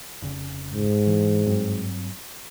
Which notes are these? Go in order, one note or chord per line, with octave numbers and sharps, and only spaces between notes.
F1 C#3
G#2
E3
G2 F#3 C4